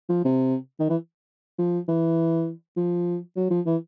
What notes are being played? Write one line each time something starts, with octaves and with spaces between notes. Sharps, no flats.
F3
C3
D#3
E3
F3
E3
F3
F#3
F3
E3